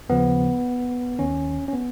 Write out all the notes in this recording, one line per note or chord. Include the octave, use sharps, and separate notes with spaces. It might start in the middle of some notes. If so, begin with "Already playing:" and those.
D#2 C#3 F3 B3
D#2 D#3 C#4
C#4
B3